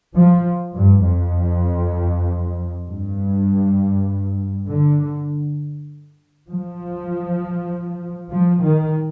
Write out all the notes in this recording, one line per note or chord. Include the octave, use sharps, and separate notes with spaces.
F3
G2
F2
G2
D3
F3
F3
D#3